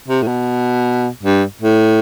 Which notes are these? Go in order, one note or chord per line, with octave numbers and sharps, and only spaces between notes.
C3
A2
B2
G2
A2